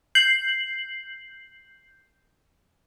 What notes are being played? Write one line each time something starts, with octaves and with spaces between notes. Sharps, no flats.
G6 C7 F#7